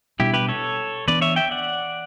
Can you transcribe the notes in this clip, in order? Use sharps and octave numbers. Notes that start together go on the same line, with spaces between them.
B2 G3 B3 D4 E4 G4
G4 B4
A4 C#5
E3 B3 D4 B4 D5
C#5 E5
E5 G5
D5 F#5